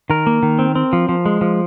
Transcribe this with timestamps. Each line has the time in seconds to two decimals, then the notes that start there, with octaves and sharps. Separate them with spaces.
0.10 D#3 A#4
0.27 A#3
0.43 D#3
0.59 C4
0.75 C4
0.93 F3
1.09 F3
1.26 G#3
1.41 F3